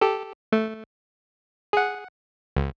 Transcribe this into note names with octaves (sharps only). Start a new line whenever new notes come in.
G4 A4
A3
G#4 F#5
C#2